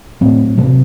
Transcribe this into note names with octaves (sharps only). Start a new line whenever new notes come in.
A2 F#3 C4
C3 F#3 C4